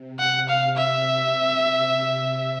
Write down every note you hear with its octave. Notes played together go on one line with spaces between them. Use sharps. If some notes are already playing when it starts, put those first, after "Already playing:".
Already playing: C3
F#5
C3
F5
C3 E5
C3